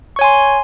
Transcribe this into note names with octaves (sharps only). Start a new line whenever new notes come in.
C#5 G#5 C6 C#6